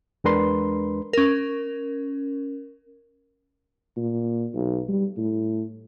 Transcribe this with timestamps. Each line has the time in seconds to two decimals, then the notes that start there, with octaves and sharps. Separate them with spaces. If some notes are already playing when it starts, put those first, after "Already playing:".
0.24 E2 G#3 D4 A#4 B4 C6
1.13 C#4 A#4
3.97 A#2
4.54 B1
4.89 G3
5.17 A2